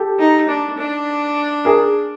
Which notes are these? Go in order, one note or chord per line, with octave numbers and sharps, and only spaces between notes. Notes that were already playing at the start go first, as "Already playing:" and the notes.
Already playing: G4 A4
D#4
D4
D4
G#4 A#4